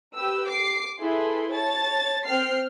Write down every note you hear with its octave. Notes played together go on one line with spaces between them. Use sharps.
G4 B4 E6
D6 C7
E4 G#4 A4 B4 C6
C#5 A5 A6
C4 G5 F6 C7